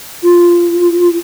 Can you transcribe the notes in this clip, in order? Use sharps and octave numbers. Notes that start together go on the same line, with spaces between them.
F4